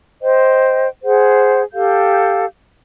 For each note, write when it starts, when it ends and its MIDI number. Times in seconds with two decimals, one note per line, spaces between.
0.22 0.87 72
0.22 0.87 75
0.22 0.87 79
1.04 1.61 68
1.04 1.61 72
1.04 1.61 78
1.72 2.44 67
1.72 2.44 69
1.72 2.44 77
1.72 2.44 91